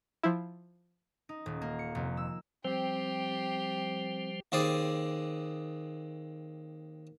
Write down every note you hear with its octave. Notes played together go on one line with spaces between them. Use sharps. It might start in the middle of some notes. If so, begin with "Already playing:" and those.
F3 E4
D#4
D#1
A#3
C#7
F1
E6
F3 G3 C4 G4 C5
D#2 C4 G#4 D5